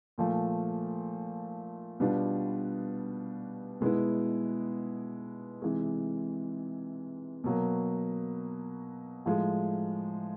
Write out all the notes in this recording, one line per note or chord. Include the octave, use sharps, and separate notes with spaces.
A#2 F3 A3
B2 G3 B3 D4 F4
B2 G#3 B3 E4
C3 E3 G#3
B2 F#3 A#3
A2 F3 G#3